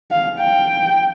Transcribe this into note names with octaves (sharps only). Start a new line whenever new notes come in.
F5
G5